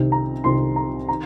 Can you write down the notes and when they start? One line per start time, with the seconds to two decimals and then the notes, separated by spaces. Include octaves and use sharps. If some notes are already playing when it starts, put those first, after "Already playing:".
Already playing: C2 C3 D#3 C4 D#4
0.12 A#5
0.44 C2 C3 D#3 C4 D#4 C6
0.76 A#5
1.09 D#3 A#5